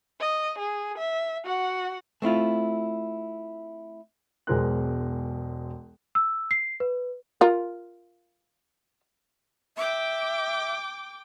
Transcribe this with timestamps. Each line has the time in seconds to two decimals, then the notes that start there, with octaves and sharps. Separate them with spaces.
0.20 D#5
0.59 G#4
0.98 E5
1.45 F#4 F#5
2.22 A3 C4 E4 F4
4.47 E1 B1 G#3 A#4 C5 F#6
6.15 E6
6.51 C7
6.80 B4
7.41 F4 A#4
9.77 E5 G5 D6